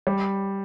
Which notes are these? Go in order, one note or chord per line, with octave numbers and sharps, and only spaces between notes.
G3